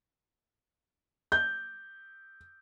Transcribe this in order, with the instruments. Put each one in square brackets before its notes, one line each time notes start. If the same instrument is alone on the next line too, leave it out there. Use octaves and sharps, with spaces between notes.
[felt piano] G6